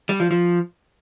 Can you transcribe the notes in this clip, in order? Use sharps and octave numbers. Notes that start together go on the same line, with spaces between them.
G3
F3
F3